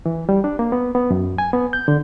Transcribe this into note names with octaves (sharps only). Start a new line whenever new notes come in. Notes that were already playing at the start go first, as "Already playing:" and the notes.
E3
G3
D4
A#3
B3
B3
F#2
G#5
B3
G6
D3